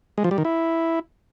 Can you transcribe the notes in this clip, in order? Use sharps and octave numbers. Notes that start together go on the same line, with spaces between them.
G#3
F3
G3
D#3
E4